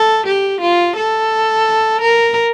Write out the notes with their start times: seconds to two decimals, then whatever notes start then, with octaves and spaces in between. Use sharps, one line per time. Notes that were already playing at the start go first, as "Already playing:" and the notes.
Already playing: A4
0.26 G4
0.61 F4
0.96 A4
2.01 A#4